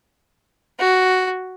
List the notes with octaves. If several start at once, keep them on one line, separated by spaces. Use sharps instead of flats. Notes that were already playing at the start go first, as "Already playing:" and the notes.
F#4